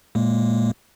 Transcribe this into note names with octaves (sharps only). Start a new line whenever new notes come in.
A#2 G#3 A#3